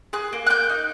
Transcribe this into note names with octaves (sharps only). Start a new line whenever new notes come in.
G#4 F#6
A#3
F#6
A#3 G6
D#4